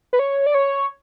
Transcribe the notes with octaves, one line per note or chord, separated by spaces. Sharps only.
B4
C#5
D5
C#5